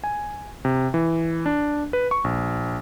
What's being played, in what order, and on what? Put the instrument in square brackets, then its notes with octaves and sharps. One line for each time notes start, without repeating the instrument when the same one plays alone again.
[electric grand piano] G#5
C3
E3
D4
B4
C#6
A#1